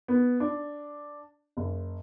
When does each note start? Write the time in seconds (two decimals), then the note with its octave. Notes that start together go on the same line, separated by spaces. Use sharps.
0.08 B3
0.40 D4
1.57 F#1